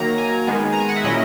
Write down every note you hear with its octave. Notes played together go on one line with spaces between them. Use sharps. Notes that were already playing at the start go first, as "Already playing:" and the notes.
Already playing: D#3 F#3 A#3 A#5
G#5
D#3 G#3 B3
A#5
G#5
F#5
E5
A#2 F#3 C#4 E4 D#5